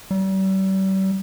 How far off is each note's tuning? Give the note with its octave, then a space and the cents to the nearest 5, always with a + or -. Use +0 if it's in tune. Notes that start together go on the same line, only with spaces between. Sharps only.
G3 -40